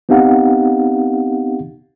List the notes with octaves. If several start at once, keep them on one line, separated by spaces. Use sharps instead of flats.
B3 C4 D#4 G4 F5 F#5